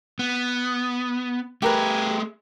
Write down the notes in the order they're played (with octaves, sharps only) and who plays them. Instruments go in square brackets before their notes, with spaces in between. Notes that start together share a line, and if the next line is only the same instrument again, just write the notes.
[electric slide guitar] B3
[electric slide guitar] A3 G#4 [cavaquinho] G4 A#4 B4